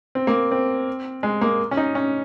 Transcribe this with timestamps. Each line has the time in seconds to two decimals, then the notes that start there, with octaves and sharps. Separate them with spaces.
0.15 C4
0.27 A#3
0.52 C4
1.23 G#3
1.41 A#3
1.71 C#4
1.77 D#4
1.95 C#4